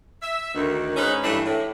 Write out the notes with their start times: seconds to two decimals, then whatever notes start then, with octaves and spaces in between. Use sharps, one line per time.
0.22 E5
0.54 D2 D#3
0.96 G#2 C#4 D#4 B4
1.23 G2 E3 A3 D4
1.45 A2